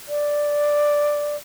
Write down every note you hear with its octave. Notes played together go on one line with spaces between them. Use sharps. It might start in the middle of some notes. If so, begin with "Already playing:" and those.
D5